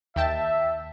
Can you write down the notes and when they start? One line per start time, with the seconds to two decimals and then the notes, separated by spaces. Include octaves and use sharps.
0.16 D#2 E5 G5 A5